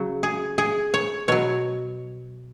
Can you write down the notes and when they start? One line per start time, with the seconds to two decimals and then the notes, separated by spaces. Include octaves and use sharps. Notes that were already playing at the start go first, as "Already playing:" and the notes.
Already playing: C#3 F#3
0.23 G#4
0.58 G#4
0.94 C#5
1.28 B2 F#3 C#5